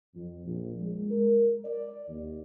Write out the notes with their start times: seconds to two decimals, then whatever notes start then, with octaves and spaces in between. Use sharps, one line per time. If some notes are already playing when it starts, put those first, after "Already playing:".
0.15 F2
0.46 A#1
0.80 G#3
1.11 A#4
1.65 D5
2.09 D#2